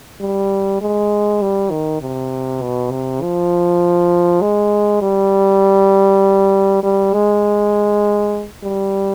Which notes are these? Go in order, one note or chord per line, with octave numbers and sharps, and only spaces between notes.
G3
G#3
G3
D#3
C3
B2
C3
F3
G#3
G3
G3
G#3
G3